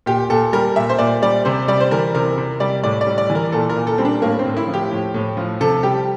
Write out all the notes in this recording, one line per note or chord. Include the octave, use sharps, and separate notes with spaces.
A#2 G4
A#2 A4
G3 A#4
A#2 E5
C5
A#2 D5
G3 D5
C3 C5
G3 D5
C5
E3 A#4
C3 A#4
C3
G3 D5
A2 D5
D5
G3
D5
E3
A#4
A#2 A4
A#4
A#2
A4
G3 C4
D4
A2 A#3
C4
A2
E4
F3
G4
A2
A2
F3
C3 A4
G3 G4